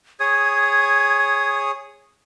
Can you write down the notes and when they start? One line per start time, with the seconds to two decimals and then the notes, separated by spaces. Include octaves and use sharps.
0.20 G#4 C#5 D#6 G#6